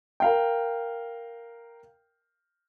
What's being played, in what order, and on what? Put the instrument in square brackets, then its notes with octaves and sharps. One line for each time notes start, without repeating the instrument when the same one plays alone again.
[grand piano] A#4 F5 G5